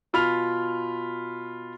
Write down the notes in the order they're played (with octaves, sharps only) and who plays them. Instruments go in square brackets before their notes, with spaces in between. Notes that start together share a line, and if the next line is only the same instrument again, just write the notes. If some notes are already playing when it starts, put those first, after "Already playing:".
[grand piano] B2 F4 B5 F6 F7